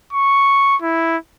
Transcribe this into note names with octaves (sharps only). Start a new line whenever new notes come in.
C#6
E4